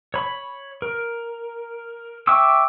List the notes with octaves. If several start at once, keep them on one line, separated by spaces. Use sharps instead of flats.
C#5 B5
A#4
E5 G5 C#6 D6 E6